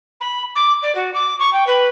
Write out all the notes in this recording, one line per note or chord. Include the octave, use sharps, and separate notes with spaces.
B5
D6
D5
F#4
D6
C#6
G5
B4